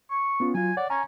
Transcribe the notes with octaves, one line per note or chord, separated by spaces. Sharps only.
C#6
B3 C#4 F4
F#3 F4 G#5
C#5 D5 F#5
C#4 G#5 A#5